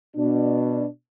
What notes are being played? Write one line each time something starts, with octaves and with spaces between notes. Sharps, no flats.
B2 D4